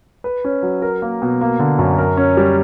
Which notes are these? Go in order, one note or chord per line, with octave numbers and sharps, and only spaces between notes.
B4
C#4
F#3
A#4
A#3
B2
A#3
D3
F#2
A#4
C#4
G3